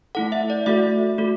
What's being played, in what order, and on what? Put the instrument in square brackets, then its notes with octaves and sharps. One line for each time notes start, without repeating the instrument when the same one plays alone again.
[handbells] A3 E4 A4 F#5
E5
D5
A3 F#4 A4 E5
A3 F#4 A4